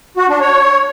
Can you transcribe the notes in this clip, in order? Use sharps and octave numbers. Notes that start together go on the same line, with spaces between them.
F#4
D4
C#5